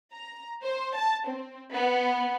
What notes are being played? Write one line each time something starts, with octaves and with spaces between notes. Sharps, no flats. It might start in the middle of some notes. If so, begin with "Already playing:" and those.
A#5
C5
A5
C4
B3